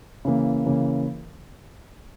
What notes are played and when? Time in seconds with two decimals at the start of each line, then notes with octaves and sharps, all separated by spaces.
0.25 C#3 E3 A#3
0.66 C#3 E3 A#3